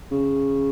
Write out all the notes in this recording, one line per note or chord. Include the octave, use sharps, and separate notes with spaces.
C#3